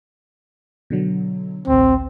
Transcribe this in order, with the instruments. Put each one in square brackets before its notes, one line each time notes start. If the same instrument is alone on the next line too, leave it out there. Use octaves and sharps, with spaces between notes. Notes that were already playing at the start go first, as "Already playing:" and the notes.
[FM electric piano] B2 D3 F#3
[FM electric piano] A1 D2 [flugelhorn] C4